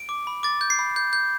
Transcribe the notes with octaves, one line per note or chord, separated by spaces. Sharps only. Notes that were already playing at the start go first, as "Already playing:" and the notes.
Already playing: D7
D6
B5
D6 A6
G6
C7
B5
G6
G6